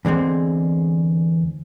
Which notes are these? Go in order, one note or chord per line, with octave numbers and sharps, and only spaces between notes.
E2 D3 G#3 C4